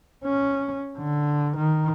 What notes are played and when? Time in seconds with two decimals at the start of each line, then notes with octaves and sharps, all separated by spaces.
0.24 C#4
0.98 D3
1.56 D#3